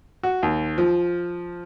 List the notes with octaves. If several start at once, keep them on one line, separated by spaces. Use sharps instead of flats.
F#4
D#2
F3